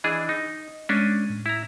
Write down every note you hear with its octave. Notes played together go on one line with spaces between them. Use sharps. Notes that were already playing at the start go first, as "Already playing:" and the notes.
E3 D4 G#4 D#5
D#4
G#3 C#4 D4 D#7
A2
E4 A#5